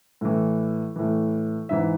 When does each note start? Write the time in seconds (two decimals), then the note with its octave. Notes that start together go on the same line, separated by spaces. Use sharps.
0.21 A2 E3
0.96 A2 E3
1.69 G#2 E3 E5